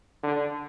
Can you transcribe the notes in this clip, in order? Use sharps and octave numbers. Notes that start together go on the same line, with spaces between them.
D3